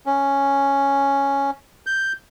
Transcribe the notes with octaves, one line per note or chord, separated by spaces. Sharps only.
C#4
G6